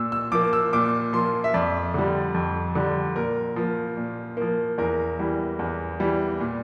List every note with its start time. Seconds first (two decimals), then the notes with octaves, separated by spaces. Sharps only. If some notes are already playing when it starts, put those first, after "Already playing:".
Already playing: A#2 E6
0.12 E6
0.32 F3 A#3 D6
0.53 E6
0.73 A#2 D6
1.13 F3 A#3 C6
1.44 E5
1.54 F2 D5
1.94 D3 G3
2.34 F2
2.75 D3 G3
3.16 A#2 A#4
3.56 F3 A#3
3.97 A#2
4.37 F3 A#3
4.78 E2 A#4
5.19 E3 G3
5.59 E2
6.00 E3 G3
6.40 A#2